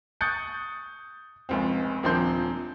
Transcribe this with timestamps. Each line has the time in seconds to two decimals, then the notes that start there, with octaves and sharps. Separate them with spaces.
0.21 C#6 D#6 F#6 G6 A6 C#7
1.49 F1 C#2 C4
2.03 D#1 F3 C4 D4 C6 G6